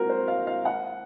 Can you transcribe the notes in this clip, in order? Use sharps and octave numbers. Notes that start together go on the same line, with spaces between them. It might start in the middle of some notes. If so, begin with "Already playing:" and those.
Already playing: C4 F4 F#4 A#4
C5
F5
F5
F#5